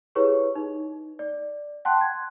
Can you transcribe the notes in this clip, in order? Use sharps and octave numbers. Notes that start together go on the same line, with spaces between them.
E4 G4 G#4 B4 C#5 C#6
D#4
D5
F#5 G5 A5 C6 F#6
G#6